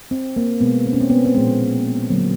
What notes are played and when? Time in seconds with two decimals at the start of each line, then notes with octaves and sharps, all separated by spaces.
0.11 C4
0.36 A#3
0.61 B2 G#3 B3
0.86 C4
0.93 C#4
1.00 C4
1.10 B3
1.25 C4
1.35 A#2 F3 G#3 B3
2.10 D3 F#3 A#3